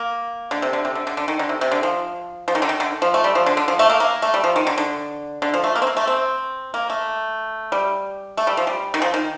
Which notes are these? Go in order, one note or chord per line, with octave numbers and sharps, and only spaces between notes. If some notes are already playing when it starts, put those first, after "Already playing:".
Already playing: A#3
D3
C3
D3
C3
D3
D3
D3
D#3
D3
C3
C3
D3
F3
F3
D#3
D3
D#3
D3
F3
A3
G3
F3
D3
D3
F3
A3
A#3
A#3
A3
G3
F3
D#3
D3
D3
D3
F3
A3
A#3
C4
A#3
A3
C4
A#3
A3
G3
A3
G3
F3
G3
D#3
F3
D#3